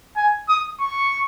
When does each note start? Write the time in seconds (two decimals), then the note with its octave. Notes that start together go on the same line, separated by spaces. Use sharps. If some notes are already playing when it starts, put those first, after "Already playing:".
0.17 G#5
0.49 D#6
0.80 C#6